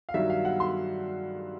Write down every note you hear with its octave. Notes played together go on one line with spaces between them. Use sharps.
F5
G2 D#3 F#3 E5
F5
F#5
C6